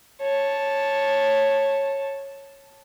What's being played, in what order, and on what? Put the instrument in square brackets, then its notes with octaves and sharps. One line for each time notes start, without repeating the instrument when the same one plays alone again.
[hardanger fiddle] C#5 A5